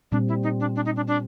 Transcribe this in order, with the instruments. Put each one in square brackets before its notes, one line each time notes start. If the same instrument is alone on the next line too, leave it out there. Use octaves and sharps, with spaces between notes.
[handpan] A#2 G3 C4 [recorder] D4
[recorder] E4
D#4
D4
D4
D#4
D4
D4